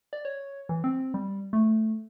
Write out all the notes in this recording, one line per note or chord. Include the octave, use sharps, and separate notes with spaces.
D5
C#5
E3
C4
G3
A3